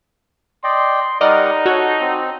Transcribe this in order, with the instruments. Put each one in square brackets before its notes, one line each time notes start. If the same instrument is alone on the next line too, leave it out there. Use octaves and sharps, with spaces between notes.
[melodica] D5 D#5 G5 [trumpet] C6
[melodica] G3 A#4 F#5 [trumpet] D#4 [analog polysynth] D5 D#5 F6
[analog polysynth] F#4 C#5 [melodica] A4
[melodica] C4